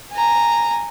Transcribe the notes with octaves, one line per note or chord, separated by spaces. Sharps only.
G#5 A#5